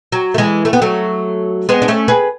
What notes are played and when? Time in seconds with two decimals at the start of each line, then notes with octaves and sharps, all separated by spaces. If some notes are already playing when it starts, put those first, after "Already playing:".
0.12 F#3
0.34 A3
0.38 E3 G#3
0.65 A3
0.73 B3
0.82 F#3 A3
1.69 G#3 B3
1.82 D4
1.88 A3 C#4
2.08 G#4 B4